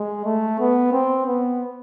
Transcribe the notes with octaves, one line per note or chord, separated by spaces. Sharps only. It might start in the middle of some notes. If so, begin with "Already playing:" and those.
Already playing: G#3
A3
B3
C4
B3